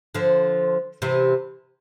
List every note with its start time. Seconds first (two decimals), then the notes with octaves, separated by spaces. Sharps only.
0.15 D3 F3
1.02 C3 E3